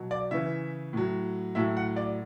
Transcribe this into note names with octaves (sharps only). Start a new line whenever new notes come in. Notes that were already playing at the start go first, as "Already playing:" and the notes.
Already playing: B2 F#3
D5
C#3 E3 E5
A2 F#3
A2 F#3 E5
F#5
D5